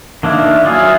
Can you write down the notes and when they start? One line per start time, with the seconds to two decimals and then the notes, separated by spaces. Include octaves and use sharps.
0.23 D#3 A#3 D4 E4
0.65 F#3 E4 F4 G#4